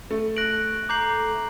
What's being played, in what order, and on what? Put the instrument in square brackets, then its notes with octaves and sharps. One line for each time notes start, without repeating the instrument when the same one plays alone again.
[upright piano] A3
[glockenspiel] F#6 A#6 D7 F#7
A#5 D6 G6 C7 F#7